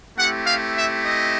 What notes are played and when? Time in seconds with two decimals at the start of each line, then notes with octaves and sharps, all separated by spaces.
0.16 A3 C4 E4 G4 F#5
0.46 F5
0.76 E5
1.05 D#5